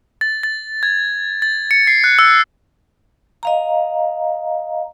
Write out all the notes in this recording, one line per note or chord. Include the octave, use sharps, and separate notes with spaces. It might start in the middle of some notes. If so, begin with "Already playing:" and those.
A6
A6
G#6
A6
C#7
C7
F#6
E6
D#5 F5 A#5